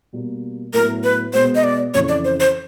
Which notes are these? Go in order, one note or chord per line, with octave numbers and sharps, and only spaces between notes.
B2 G3 A#3
A2 F#3 B3 E4 A#4
B4
B2 G#3 B3 C5
D#5
D5
F2 C#3 E3 C#5
D5
C5
C5